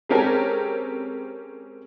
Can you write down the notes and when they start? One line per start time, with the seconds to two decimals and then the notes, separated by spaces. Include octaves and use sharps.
0.09 G#3 C4 C#4 G4 A4 A#4